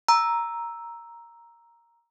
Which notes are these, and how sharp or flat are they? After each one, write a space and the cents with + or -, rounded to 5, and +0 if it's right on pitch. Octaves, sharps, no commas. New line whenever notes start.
A#5 +0 E6 +0